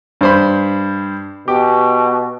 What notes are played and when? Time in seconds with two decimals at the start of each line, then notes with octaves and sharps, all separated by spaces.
0.21 G2 C5 B5
1.48 B2 G4